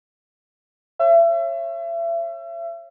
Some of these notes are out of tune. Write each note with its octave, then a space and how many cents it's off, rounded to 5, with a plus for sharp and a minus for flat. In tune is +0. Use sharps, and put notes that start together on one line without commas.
C#5 -25 E5 +35